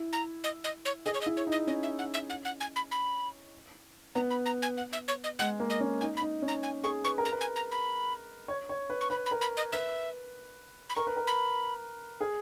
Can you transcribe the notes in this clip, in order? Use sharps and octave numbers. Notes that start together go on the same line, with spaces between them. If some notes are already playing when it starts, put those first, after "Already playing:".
Already playing: E4
A#5
D#5
D#5
C#5
G#4 D#5
C#5
D#5
E4
C#5
D#4
D#5
C#4 D#5
E5
F#5
E5
F#5
F#5
G#5
B5
B5
B3 A#5
B5
A#5
G#5
F#5
E5
C#5
D#5
G#3 F#5
A#3
D#5
C#4
D#4 G#5
B5
D#4
C#4
A#5
G#5
G#4 C#6
B4 C#6
A#4
A#5
B4
G#5
A#5
B5
C#5
C#5
B4
C#6
B4 B5
B5
A#4
B5
D#5
B4 E5
B5
A#4 C#6
B4
A#4
B5
G#4